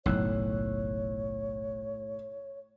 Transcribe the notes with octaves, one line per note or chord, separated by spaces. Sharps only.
F#1 B1 A2 C#5 E6 F#6